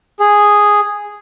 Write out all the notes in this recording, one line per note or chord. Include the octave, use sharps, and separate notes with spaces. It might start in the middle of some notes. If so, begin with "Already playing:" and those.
G#4